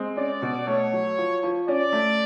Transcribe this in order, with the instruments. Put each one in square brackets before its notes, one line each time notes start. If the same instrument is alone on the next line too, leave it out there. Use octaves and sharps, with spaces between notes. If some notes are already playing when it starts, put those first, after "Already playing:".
Already playing: [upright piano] G#3 C4
[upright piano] C#4 [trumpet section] D5
[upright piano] B2
[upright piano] A3 [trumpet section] C#5
[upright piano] F#3
F3
F3
[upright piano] C#4 [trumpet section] D5
[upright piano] A3